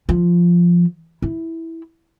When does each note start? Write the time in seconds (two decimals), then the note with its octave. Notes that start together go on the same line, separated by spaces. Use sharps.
0.09 F3
1.22 E4